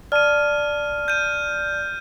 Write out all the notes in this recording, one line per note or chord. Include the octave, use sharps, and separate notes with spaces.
D5 A5 F6 D#7
G6 D#7